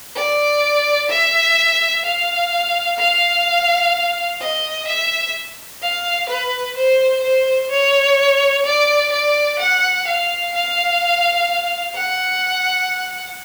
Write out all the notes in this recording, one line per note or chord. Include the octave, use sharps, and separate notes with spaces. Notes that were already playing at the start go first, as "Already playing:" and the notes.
D5
E5
F5
F5
D#5
E5
F5
B4
C5
C5
C#5
D5
D5
F#5
F5
F5
F#5